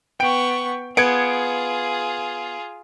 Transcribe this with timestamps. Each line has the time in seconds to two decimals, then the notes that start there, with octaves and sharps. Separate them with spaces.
0.20 B3 G5 C#6 D7
0.97 B3 F4 G#4 G#6 C#7 D7